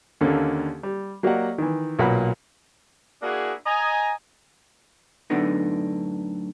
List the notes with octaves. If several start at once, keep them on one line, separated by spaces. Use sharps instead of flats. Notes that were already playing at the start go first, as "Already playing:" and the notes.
D#2 D3 A#3 C#4 A4
G3
F#3 A#3 G4 D5 D#5 F#5
D#3 E3
B1 A#2 A#3 B4 F#5 B5
A#3 D4 E4 F#4 G#4
D#5 G#5 A#5
F#2 A2 D3 B3 D4 D#4